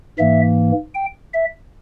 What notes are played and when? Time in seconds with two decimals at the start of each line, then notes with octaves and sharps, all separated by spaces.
0.19 G#2 E3 A#3 E5
0.95 G5
1.34 E5